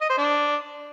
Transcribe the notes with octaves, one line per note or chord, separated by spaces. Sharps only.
D#5
C5
D4